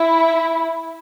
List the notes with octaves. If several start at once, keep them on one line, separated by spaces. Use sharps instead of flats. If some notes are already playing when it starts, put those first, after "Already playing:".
Already playing: E4